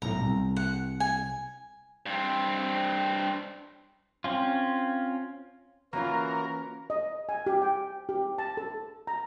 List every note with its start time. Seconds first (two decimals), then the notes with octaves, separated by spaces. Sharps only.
0.02 B1 A2 A#5
0.20 C2
0.56 F#5
1.00 G#5
2.06 G2 C4
4.24 C4 C#4 F4
5.93 E3 A#3 C#4 F4 F#4 A#4
6.90 D#5
7.29 G#5
7.46 G4
7.62 G5
8.09 G4
8.38 A5
8.57 A4
9.07 A#5